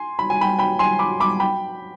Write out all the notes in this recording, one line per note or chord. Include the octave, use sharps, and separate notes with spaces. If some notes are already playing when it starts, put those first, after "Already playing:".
Already playing: G#5 C6
B5
G#5
G5 B5
G5 B5
G#5 C6
B5 D6
B5 D6
G5 B5